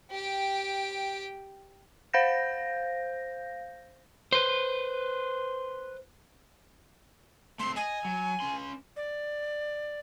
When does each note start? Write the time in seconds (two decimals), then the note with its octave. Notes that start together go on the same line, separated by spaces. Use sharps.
0.11 G4 G5
2.13 C5 F5 G6 A#6
4.32 B4 C5
7.60 A3 C4 C6
7.76 D#5 G#5
8.05 F#3
8.40 C#4 C6
8.96 D5